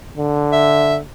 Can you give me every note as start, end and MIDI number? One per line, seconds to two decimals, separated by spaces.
0.17 1.00 50
0.52 0.96 76